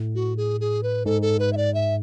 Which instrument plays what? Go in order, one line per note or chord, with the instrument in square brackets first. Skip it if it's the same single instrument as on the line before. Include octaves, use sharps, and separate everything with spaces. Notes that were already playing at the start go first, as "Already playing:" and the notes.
Already playing: [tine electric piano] A2
[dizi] F#4
G#4
G#4
B4
[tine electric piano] G#2 [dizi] A4
[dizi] A4
B4
E5
D5
E5